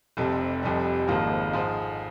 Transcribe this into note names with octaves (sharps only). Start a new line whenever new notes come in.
F1 F2 C3 G3
F1 F2 C3 G3
G#1 G#2 F3 A#3
G#2 F3 G#3